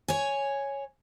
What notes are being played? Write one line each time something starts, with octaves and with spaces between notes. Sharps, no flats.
C#5 G#5